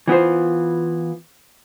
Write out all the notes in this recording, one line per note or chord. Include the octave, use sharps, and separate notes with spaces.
E3 B3 F4 C5